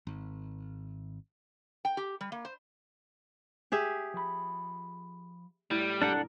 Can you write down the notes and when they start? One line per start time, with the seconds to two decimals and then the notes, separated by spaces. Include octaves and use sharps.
0.07 G#1
1.85 G5
1.97 G4
2.21 G3
2.32 A#3
2.45 C5
3.72 G4 G#4 E5
4.14 F3 B5
5.71 A2 G3
6.02 F2 G#2 C3 D4 A4 A#4 F#5